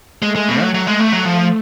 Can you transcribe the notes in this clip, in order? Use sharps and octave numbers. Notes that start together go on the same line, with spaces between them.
G#3 A3
G#3
B2
F#3
F#3
G#3
A3
F#3
F3